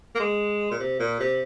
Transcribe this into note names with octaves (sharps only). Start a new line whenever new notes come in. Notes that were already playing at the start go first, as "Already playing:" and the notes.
A#3
G#3
A#2
C3
A#2
C3